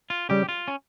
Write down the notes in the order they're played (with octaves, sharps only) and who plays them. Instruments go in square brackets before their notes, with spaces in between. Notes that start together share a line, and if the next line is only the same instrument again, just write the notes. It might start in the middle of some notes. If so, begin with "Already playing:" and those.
[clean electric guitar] F4
[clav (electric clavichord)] C#3 G3 [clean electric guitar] G4
[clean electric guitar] F4
C#4